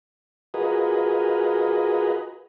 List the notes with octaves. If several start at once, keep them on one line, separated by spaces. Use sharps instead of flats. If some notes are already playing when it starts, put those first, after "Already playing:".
F4 F#4 G#4 A#4 B4 D#5